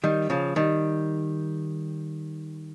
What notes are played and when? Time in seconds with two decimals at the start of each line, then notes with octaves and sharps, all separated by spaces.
0.04 D#3 G3
0.30 C#3 F3
0.56 D#3 G3